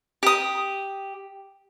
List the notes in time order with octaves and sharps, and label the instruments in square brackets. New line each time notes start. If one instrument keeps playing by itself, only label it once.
[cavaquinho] G4 D#6